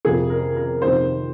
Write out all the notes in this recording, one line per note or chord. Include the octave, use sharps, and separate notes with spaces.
F2 C3 F3 G#4
A#4
A#4
F2 C3 D#3 A#3 C5